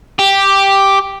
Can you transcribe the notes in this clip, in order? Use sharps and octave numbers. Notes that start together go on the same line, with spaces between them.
G4